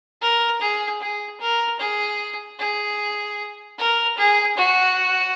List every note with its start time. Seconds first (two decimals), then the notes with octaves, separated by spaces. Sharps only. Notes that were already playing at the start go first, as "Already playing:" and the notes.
0.21 A#4
0.61 G#4
1.01 G#4
1.40 A#4
1.79 G#4
2.59 G#4
3.78 A#4
4.17 G#4
4.57 F#4